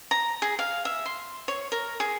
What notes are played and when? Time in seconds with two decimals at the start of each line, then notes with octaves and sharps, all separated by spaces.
0.11 A#5
0.42 G#4
0.59 F5
0.85 E5
1.06 C6
1.48 C#5
1.72 A#4
2.00 G#4